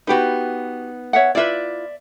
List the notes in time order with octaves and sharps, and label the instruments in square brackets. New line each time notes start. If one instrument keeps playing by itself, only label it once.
[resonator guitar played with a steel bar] B3 D#4 [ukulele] F#4 G4 B4
[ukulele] C#5 E5 F#5
[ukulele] E4 F4 B4 [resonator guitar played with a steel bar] D5 E5